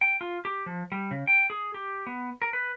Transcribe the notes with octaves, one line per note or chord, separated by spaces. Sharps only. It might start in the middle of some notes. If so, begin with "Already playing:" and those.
G5
F4
G4
F3
G3
C#3
G5
G#4
G4
B3
A#4
B4